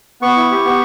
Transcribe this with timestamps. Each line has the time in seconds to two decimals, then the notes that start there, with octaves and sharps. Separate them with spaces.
0.21 B3 C#6
0.36 E4
0.51 G4
0.65 B3